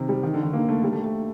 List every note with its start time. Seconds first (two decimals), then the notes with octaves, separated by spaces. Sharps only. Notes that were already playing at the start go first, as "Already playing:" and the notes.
Already playing: C3 D#3
0.09 G3
0.23 D#3
0.34 D3
0.43 D#3
0.53 A#3
0.69 A3
0.84 G3
0.93 A3
1.04 A3